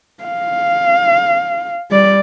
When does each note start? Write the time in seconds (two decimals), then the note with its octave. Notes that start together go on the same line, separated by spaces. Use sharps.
0.24 F5
1.91 G3 D5